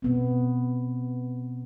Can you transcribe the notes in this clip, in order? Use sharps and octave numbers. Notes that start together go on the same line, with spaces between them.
B2 B3 C4